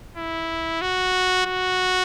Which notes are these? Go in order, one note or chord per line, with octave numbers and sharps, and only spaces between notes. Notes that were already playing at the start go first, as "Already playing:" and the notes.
E4
F#4
F#4